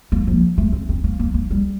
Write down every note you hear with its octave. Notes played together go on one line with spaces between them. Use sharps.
A#3
F3
A3
C4
C4
A#3
A#3
A#3
G3